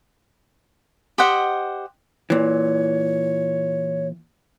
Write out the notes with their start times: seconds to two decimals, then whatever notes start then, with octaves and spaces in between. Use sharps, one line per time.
1.18 G4 C5 D#5 F#5
2.30 A#2 E3 C#5